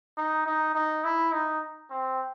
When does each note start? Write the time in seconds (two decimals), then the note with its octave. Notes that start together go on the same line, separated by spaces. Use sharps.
0.18 D#4
0.46 D#4
0.75 D#4
1.04 E4
1.32 D#4
1.90 C4